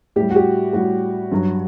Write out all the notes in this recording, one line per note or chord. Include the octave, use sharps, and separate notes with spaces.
A2 G3 G4
F#4
G4
A2 G3 F#4
G2 F#3